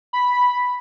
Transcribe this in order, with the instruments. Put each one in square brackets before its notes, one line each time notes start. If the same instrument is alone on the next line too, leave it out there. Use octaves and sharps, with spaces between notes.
[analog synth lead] B5